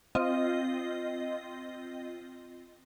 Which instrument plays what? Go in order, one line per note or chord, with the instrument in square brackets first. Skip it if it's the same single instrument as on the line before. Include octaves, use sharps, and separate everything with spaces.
[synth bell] C4 F4 D#5